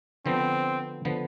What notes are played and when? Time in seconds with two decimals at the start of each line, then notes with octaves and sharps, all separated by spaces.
0.26 D3 F3 B3 C4
1.05 D3 F3 B3